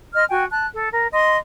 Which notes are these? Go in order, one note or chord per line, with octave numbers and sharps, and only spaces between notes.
D#5 C6 F6
F#4 G5 G#5
A5 F#6
A4
A#4
D#5 C6